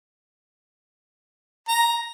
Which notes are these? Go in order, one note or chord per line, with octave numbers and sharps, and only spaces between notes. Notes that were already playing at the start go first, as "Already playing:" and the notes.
A#5